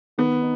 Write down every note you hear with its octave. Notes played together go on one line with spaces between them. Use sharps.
D#3 B3
D#4